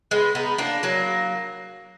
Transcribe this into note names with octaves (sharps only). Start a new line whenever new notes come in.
G#3 B3
B3 D#4
A#3 D4
F#3 A#3